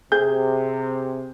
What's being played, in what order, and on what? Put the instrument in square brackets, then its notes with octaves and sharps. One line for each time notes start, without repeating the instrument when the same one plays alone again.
[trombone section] C3 [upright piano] G#4 G6